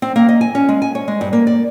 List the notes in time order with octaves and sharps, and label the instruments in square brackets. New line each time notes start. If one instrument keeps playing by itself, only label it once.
[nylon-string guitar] C4
A#3
D#5
G#5
C#4
G#3
G#5
C#5
G#3
G2
A#3
D5